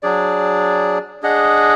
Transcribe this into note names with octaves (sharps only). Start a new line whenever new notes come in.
F#3 D4 G#4 D5
D4 G#4 D#5 F#5